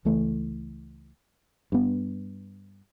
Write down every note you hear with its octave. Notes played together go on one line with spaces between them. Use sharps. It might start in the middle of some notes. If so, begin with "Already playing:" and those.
C#2 E3 A3
G2 B3